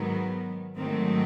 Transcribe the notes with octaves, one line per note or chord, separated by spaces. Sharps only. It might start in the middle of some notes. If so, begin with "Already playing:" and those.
Already playing: G#2 D#3 F#3 B3
G#2 D#3 F#3 A3 C4